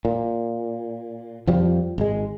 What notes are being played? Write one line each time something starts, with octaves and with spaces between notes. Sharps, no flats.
A#2
F2 F3 G3
G#1 G#3